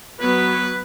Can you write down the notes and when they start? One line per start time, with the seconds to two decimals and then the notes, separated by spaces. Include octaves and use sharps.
0.20 F#3 B3 B4